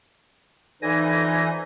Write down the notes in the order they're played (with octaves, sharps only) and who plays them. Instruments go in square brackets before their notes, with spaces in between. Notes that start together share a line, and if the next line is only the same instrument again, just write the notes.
[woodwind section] F2 D3 D#4 [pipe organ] E3 G#5 A#6